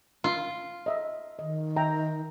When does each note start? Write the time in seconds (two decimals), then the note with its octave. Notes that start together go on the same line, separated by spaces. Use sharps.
0.24 F4
0.86 D#5 E5
1.39 D#3 D#5
1.76 E5 G5 A#5